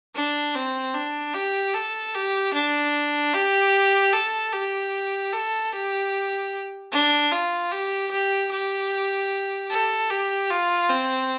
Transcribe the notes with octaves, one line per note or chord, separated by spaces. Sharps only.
D4
C4
D4
G4
A4
G4
D4
G4
A4
G4
A4
G4
D4
F4
G4
G4
G4
A4
G4
F4
C4